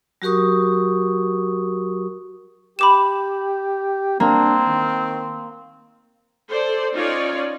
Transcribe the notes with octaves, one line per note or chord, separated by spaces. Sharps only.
F#3 F#4 G4 A#4 C#6 D#6
G4 B5 D6 E7
A#3 C4 D4
D#3
A4 C5 D5
C#4 D#4 F4 C#5 D5